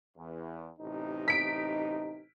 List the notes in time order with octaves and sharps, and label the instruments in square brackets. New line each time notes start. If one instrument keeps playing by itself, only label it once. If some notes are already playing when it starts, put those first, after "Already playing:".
[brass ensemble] E2
A1 C3 D#4
[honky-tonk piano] B6 D7